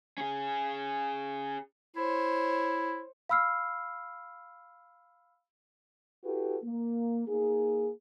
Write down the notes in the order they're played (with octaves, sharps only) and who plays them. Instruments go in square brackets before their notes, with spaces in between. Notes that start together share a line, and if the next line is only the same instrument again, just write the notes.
[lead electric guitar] C#4 G#4
[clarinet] E4 [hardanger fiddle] C5 C#5
[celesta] F5 B5 E6 F6 C7
[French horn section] E4 F#4 G4 A4 B4
A#3
A#3 D#4 G#4